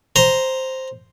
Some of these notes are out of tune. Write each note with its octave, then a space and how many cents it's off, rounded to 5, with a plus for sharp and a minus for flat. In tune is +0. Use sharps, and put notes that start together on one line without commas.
C5 +0 A#5 +0